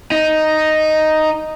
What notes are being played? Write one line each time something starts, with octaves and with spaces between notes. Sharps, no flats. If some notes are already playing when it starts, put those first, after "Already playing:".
D#4